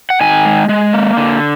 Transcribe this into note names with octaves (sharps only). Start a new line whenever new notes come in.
F#5
D#3 G#5
G#3
G#3
A#3
D3